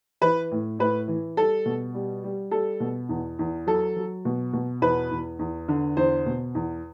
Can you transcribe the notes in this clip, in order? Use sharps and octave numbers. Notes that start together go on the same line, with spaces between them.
E3 B4
A2
A2 B4
E3
G3 A4
B2
G3
G3
G3 A4
B2
E2
E2
F#3 A4
F#3
B2
B2
E2 B4
E2
E2
D3
E2 C5
B2
E2